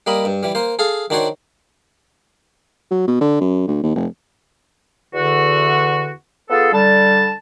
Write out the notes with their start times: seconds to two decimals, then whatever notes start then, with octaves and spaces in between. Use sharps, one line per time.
0.07 G3 A#3 D#5 B5
0.25 G2
0.43 E3 G3
0.55 A#3 C5
0.79 G#4 A4 F5
1.10 D#3 D4 F#4 C5 C#5
2.91 F#3
3.07 B2
3.21 D3
3.40 F#2
3.67 D2
3.83 D#2
3.95 F1
5.14 E2 D3 F#4
6.50 B3 F4 G#4 A4
6.73 D3 G3 A5